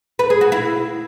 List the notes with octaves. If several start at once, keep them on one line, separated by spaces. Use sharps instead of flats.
B4
G#4
F#4
E4